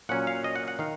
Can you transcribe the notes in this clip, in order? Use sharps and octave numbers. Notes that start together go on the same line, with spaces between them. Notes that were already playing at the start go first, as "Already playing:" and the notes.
A#2 F#3 C#4 F#5
F5
D#5
F#5
F#5
D#3 F5